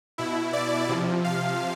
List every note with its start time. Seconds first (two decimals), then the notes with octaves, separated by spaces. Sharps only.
0.18 B2 E4
0.53 D5
0.89 C3 F3
1.24 F5